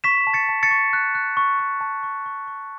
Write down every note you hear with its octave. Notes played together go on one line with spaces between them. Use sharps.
C#6 B6 E7
A5
A6 C#7
A5
A6 C#7
C#6
F#6
F#6
C#6
C#6
A5
C#6
C#6
C#6